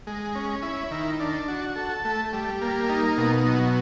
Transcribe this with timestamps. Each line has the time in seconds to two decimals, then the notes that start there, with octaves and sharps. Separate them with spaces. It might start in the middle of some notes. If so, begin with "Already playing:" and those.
0.07 G#3
0.35 C#4
0.63 E4
0.91 D#3
1.20 D4
1.48 F#4
1.76 A4
2.05 A3
2.33 G3
2.62 A#3
2.89 D#4
3.17 B2
3.46 F#3